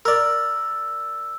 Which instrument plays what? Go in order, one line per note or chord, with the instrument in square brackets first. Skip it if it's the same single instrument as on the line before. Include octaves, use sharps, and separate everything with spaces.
[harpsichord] A#4 D5 [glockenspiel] E6